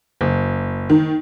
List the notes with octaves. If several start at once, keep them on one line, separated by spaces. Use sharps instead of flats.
F#1
D#3